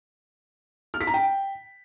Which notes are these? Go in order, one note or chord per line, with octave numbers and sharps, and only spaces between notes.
F6
B6
A#5
G5